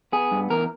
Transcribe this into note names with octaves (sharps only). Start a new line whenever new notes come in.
B3 G#4
G2
E2 A#4